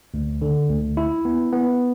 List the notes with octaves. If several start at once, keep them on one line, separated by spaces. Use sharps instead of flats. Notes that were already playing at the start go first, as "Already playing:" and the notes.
D2
D3
D2
E4
B3
B3